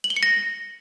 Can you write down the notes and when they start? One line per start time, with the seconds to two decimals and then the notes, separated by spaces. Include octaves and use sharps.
0.04 F#7
0.10 G7
0.16 C#7
0.23 A#6